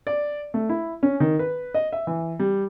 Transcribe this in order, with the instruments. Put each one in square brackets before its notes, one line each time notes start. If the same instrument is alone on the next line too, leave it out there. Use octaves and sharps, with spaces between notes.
[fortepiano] D5
A3
E4
C#4
D#3
B4
D#5
E5
E3
G3